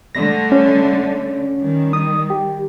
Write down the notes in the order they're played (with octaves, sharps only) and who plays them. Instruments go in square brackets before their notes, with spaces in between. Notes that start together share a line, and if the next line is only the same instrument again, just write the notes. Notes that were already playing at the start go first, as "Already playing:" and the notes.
[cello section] D3 G3 A3 [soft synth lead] A#6
[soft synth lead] C#4
[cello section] D#3 G3
[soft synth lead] D#6
G4